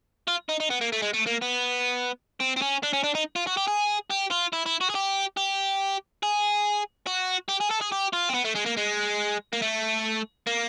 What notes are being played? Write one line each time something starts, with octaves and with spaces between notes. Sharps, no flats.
F4
D#4
D#4
B3
A#3
A3
G#3
A3
A#3
B3
C4
C4
C#4
D4
C#4
D4
D#4
F4
F#4
G4
G#4
G4
F4
E4
E4
F#4
G#4
G4
G4
G#4
F#4
G4
G#4
A4
G#4
G4
F4
C4
B3
A3
G#3
A#3
G#3
A#3
A3
A#3